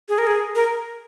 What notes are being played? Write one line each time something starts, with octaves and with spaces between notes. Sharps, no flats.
G#4
A#4
G#4
A#4